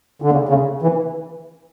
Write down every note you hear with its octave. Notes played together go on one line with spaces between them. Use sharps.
D3
C#3
C#3
E3